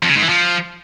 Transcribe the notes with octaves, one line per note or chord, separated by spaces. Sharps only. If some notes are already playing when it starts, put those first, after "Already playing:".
F2
C#3
G#2
E3
F3